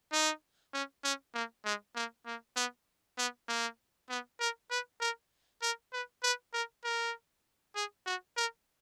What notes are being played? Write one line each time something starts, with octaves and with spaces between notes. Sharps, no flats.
D#4
C#4
C#4
A#3
G#3
A#3
A#3
B3
B3
A#3
B3
A#4
B4
A#4
A#4
B4
B4
A#4
A#4
G#4
F#4
A#4